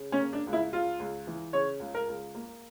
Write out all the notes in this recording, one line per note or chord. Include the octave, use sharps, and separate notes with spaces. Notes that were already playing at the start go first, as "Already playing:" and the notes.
Already playing: C#3
C#4
A#3
D4
C#2
E4
C#2 F4
C#2
E3
C#3 C#5
C#2
A#4
C#2
A#3